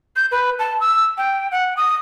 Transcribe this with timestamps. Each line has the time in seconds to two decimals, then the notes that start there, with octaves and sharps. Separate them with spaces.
0.16 G6
0.31 B4
0.59 A5
0.80 E6
1.18 G5
1.51 F#5
1.77 D#6